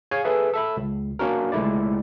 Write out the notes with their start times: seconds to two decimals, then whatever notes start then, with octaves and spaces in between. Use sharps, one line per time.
0.11 G#4 C#5 F5 G#5
0.25 G#4 A4 B4 E5
0.54 A4 E5 B5
0.77 C#2
1.19 A#3 C#4 D4 F#4 A#4
1.52 C#2 G#3 A3 E4 D5